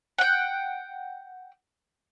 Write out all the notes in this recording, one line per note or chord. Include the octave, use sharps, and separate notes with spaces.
F#5 G5